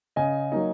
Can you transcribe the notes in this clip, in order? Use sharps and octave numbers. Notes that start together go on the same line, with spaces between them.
C#3 D#5 G#5
F#3 A#3 D#4